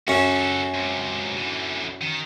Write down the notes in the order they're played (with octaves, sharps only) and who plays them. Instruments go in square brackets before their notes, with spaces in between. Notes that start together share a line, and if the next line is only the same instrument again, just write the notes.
[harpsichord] F#2 C#4 [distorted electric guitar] F#4 A4
[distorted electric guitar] C#2 C3
D3 E3
D#3